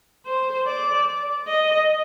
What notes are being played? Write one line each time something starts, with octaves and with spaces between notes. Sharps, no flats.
C5
D5
D#5